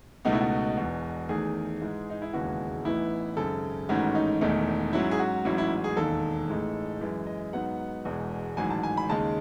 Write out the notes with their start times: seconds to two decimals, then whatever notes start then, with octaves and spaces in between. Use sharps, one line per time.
0.25 C#2 B2 A3 D#4 F#4
0.33 E4
0.41 F#4
0.77 E1 E2 B2
1.29 E2 D#3 A3 G#4
1.81 G#2 E3 G#3
2.10 D#4
2.22 E4
2.33 E1 D#2 C#3 E3 G#3 F#4
2.85 A1 A2 E3 B3 D#4 E4
3.37 G#1 F#2 C#3 A4
3.89 A1 G#2 D#3 A3 C#4 F#4
4.15 D#4
4.41 E1 E2 D#3 A3 D#4
4.93 G#2 F#3 C#4 E4
5.11 G#4
5.19 F#4
5.45 A1 G#2 F#3 C#4 E4
5.58 E4
5.84 G#4
5.97 E1 D#2 D#3 A4
6.49 A1 A2 G#3 D#4
7.01 F#2 E3 G#3
7.27 D#5
7.53 G#2 F#3 B3 D#4 F#5
8.05 E1 E2 B2 G#3
8.57 A1 G#2 D#3 F#3 G#5
8.70 A5
8.83 G#5
8.97 B5
9.09 D#2 C#3 G#3 D#4 A5